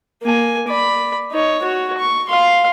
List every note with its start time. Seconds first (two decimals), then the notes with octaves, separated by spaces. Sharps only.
0.22 A#3 G#5
0.68 D5 B5
1.32 D#4 C#5
1.62 F#4 C#5
1.98 C#6
2.29 F5 C6